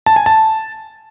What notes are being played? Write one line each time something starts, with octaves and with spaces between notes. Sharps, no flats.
A5
G#5
A5